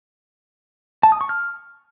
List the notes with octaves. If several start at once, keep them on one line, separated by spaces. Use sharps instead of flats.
A5
D#6
C#6
F6